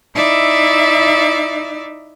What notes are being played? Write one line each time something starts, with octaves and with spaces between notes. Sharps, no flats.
D#4 E4 D5 E5